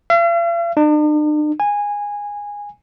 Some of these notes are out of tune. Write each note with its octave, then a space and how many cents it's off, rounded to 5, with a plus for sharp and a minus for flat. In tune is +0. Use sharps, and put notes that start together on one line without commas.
F5 -45
D4 +45
G#5 -15